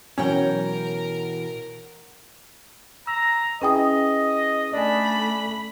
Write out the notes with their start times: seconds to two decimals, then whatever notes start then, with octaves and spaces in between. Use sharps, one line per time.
0.18 B2 E3 F#3 C#4 A#4 C#5 F#5 G5
3.07 A#5 E6
3.62 C#4 E4 G#4 B4 D#5 G5 D#6
4.73 A3 D4 D5 G#5 B5